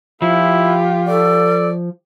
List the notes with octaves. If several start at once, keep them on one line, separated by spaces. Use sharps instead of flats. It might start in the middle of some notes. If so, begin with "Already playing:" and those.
F3 E4 F4 G4
A4 D5